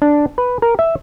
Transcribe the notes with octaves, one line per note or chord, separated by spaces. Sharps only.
D4
B4
A#4
E5